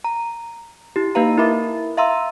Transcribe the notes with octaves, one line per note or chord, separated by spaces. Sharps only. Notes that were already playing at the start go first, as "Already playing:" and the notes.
A#5
E4 G4
A#3 D#4 G4 B4 F5 A#5
E4 A#4 E5 B5 D6 A6
E5 F5 A#5 C6 E6